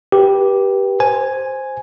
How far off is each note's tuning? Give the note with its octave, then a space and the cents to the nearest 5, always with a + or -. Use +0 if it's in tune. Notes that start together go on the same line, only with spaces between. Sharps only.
G4 +0 B4 -30
C5 +0 G#5 +0